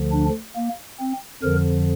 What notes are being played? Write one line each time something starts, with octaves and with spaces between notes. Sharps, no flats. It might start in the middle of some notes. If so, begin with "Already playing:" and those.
Already playing: D2 D3 F3
D4
A#3
C4
F2 D3 F3 A#4